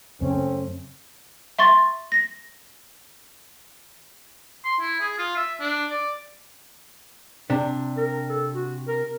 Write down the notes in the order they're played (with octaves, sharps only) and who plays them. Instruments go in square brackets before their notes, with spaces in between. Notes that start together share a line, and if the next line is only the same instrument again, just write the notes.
[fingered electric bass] F#2 C#3 [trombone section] A3 C4 C#4
[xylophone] E5 C6 C#6 A6
A#6
[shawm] C6
E4
G#4
F4
E5
D4
D5
[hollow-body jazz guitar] C3 D4
[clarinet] A#4
A4
F#4
A#4